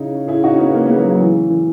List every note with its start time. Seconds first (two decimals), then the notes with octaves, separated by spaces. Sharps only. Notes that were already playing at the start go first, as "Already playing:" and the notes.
Already playing: C#3 D#4 E4
0.28 E4 G#4
0.43 D#4 F#4
0.53 C#4
0.59 B3 D#4
0.73 A#3 C#4
0.85 G#3 B3
0.97 F#3 A#3
1.08 F#3 A#3
1.20 E3 G#3
1.50 E3